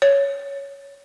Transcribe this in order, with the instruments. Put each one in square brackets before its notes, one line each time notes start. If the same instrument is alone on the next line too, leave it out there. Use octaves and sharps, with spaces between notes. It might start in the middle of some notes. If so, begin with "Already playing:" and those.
[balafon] C#5